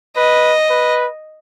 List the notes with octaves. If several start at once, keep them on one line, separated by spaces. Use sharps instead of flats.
B4 D#5
B4